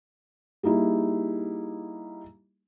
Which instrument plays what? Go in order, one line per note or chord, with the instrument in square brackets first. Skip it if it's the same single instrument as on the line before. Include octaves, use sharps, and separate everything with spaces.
[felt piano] G3 A#3 D#4 E4 G#4